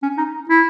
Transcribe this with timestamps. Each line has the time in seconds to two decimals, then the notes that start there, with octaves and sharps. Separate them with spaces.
0.03 C#4
0.18 D#4
0.49 E4